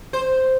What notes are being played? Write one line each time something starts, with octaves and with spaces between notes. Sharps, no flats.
C5